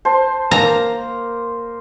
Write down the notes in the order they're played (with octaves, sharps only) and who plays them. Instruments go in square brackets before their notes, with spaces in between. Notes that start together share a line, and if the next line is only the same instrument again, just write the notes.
[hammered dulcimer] C5 [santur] A5
[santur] A#3 A#4 [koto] A#5